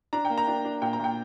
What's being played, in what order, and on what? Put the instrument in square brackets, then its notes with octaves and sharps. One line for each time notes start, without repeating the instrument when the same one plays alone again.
[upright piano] D4 A#5
G5
A#3
A#5
D4
D4
A#2 G5
A#5
A#2 G5